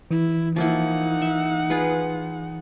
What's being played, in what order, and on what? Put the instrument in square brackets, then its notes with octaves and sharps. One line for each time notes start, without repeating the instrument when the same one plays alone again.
[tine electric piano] E3 [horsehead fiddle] E4
[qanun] F3 A#3 E4 [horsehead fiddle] D#4 F#5
[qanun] E5
F4 G#4 B4